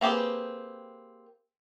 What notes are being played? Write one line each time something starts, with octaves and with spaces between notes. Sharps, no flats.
A#3 C4 G4 G#4 B4